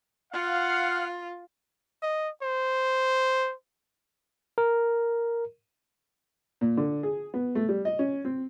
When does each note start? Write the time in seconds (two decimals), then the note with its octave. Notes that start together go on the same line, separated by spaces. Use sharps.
0.33 F4 F5 F#5
2.02 D#5
2.42 C5
4.58 A#4
6.61 A#2
6.77 D3
7.03 G#4
7.34 B3
7.55 A3
7.69 G3
7.85 D#5
7.99 C#4
8.25 C4